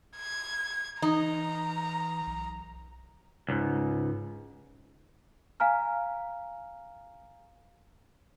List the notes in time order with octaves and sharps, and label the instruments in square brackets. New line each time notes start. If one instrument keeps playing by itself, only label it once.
[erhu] G#6
[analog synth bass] E3 [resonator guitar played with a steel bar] D#4 [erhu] A#5
[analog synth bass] B1
[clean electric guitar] C#2 G#2
[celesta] F5 G#5 A#5 F6